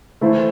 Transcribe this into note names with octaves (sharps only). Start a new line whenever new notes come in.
E3 A3 E4 A4 C5